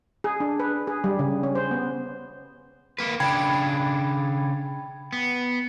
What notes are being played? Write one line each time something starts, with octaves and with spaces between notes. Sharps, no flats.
G#4
D4
B4
G#4
G3
C#3
C#4
C5
B3
A#3 B4
C#3 D4 G5 B5 G#6
B3